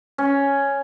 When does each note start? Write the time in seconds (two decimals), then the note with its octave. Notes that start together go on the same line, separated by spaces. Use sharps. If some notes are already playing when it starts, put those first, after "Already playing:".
0.18 C#4